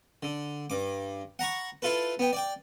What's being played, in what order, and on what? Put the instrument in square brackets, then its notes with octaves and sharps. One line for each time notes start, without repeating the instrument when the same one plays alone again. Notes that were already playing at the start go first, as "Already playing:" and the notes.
[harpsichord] D3
G2 D6
F#5 A#5 B5 C#6
E4 F4 A4 B4
B3 G5
D5 G5